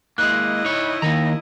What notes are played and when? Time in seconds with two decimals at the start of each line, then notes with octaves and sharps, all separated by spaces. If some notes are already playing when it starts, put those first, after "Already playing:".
0.18 G#3 A#3 E4 D#5 F#6
0.65 D#4 C#5
1.02 D#3 A#3 D#4 A#5 A#6